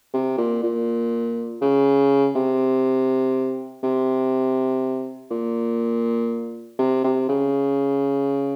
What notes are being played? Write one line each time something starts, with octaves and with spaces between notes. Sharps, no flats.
C3
A#2
A#2
C#3
C3
C3
A#2
C3
C3
C#3